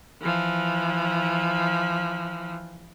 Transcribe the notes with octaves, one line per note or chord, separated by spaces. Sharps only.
E3 F3